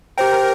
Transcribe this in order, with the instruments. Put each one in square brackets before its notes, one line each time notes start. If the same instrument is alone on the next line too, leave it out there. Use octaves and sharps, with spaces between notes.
[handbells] G4 C5 G5 [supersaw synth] A#4